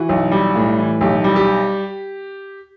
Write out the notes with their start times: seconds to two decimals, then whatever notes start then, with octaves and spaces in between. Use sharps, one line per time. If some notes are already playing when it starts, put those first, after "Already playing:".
Already playing: E3 F#4
0.09 B1
0.31 G3
0.56 A2
0.79 E3
1.01 B1 G4
1.24 G3
1.36 G4